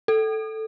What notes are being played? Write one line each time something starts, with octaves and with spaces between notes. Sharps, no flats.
A4